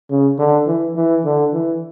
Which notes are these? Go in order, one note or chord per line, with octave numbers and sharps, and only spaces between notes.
C#3
D3
E3
E3
D3
E3